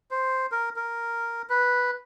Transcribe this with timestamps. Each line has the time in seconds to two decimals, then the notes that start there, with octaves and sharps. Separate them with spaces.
0.11 C5
0.52 A#4
0.76 A#4
1.50 B4